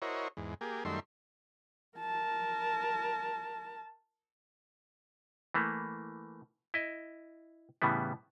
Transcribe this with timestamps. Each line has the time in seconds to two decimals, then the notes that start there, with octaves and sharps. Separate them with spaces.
0.02 E4 F#4 A#4 C5 C#5 D#5
0.37 E2 G#2
0.61 A#3 G4 G#4
0.85 F#2 D#3 G3 A3 E5 C6
1.98 A#4 A5
5.54 E3 A3 A#3
6.74 E4 D#5
7.82 A2 C#3 E3 G3 B3